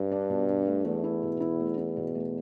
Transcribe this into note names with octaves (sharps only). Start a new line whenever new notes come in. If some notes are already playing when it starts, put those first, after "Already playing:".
Already playing: G2
D4
B2
D4
A3
E2 A3
E4
B2
E4
A3
E4
B2
A3